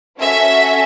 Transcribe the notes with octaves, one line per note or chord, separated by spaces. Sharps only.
C#4 F#4 A4 E5